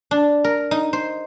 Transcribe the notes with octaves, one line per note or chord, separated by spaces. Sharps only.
D4
A#4
D#4
C5